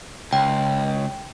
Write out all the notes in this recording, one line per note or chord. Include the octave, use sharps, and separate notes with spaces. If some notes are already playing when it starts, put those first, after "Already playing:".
C#2 G5